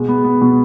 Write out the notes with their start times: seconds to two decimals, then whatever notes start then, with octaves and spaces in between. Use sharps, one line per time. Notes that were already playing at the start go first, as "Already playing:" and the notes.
Already playing: B2 G#3
0.09 B3
0.24 B3
0.42 B2